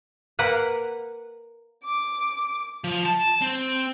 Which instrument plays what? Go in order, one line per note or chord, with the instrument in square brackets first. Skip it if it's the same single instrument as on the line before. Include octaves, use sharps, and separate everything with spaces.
[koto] A#3 A#4 B4 F#5
[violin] D6
[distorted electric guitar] F3
A5
C4